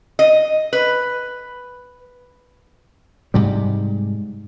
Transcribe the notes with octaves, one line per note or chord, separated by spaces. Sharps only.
D#5
B4
G#2 C3 G3